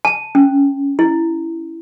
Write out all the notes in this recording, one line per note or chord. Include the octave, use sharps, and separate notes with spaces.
A5
C#4
E4